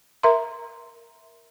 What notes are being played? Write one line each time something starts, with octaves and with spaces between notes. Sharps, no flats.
A#4 E5 A#5 C6